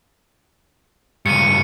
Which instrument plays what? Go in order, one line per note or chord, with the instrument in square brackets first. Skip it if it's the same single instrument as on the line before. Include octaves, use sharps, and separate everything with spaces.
[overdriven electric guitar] C#2 G2 [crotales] C#7 D#7